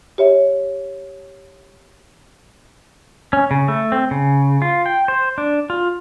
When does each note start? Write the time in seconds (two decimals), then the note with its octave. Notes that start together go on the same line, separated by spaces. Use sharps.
0.18 G4 C#5 E5
3.33 C#4
3.51 C#3
3.68 A3
3.92 C4
4.11 C#3
4.62 F4
4.86 G5
5.08 C5
5.38 D4
5.70 F4